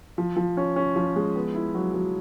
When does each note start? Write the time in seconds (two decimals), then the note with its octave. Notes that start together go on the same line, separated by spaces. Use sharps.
0.18 F3
0.36 F3
0.57 C#4
0.76 C#4
0.96 F3
1.16 G#3
1.36 B3
1.54 E4
1.75 F#3
1.94 F#3